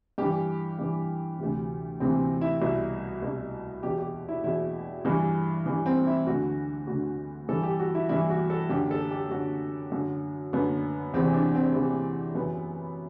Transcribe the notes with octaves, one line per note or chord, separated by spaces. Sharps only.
G2 E3 G4
G2 E3
D2 C3 E3
D2 C3 E3 C4
E4
C2 B2 E4
C2 B2
E2 B2 G4
G4
E4
E2 B2 E4
G2 E3
G2 E3
C4
E4
D2 D3 F#4
D2 D3 F#4
G2 E3 A4
G4
F#4
E4
G2 E3 E4
F#4
A4
F#2 D3 G4
A4
G4
F#2 D3 F#4
F#2 D3
F#2 D3 B3
E2 C3 E3 C4
D4
C4
E2 C3 E3
F#2 E3 B3